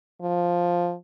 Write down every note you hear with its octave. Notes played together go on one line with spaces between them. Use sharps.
F3